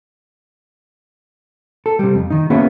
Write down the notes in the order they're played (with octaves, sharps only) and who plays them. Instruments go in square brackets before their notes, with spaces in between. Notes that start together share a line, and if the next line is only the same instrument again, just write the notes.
[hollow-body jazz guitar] A4
C3 G3
F2
D#3 D#4
A#3 B3 C#4 E4 F#4 G#4